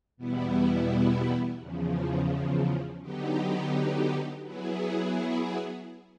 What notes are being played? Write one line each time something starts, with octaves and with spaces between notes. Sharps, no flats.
E2 B2 G3 B3 E4
E2 C#3 F3
D3 F#3 B3 D#4 G4
F#3 B3 E4 G#4